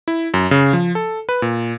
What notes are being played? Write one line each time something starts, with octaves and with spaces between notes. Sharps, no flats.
E4
F#2
C#3
F3
A4
B4
A#2